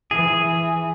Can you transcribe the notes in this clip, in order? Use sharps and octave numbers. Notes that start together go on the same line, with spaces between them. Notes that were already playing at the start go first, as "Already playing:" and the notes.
E3 G#4